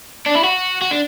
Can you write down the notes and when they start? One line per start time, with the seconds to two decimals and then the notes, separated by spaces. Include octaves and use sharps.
0.26 D4
0.35 E4
0.44 F#4
0.82 F#4
0.91 D4